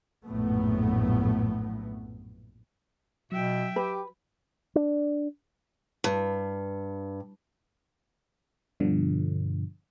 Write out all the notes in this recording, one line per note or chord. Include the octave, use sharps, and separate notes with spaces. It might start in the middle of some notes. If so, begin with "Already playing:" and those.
A#1 F#2 A2 A3 B3
B2 F#3 E5 G5
G4 B4
D4
G2
G2 B2 D3 F3